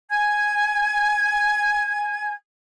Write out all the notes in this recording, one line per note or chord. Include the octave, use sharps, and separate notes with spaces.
G#5 G#6